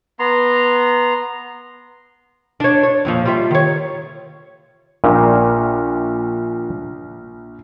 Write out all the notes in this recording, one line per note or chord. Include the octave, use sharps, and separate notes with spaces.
B3 A#5 C6
D4 C#5
C#5
F2 A#2 F3
G3 F4 E5
D#3 C#5
A#1 A#2